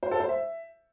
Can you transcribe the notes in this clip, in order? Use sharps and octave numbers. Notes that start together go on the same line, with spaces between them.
C5
A4
C5
E5